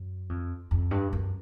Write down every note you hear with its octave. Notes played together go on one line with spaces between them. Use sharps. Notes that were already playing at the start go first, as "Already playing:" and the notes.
Already playing: F#2
F2
F2
G2
F#2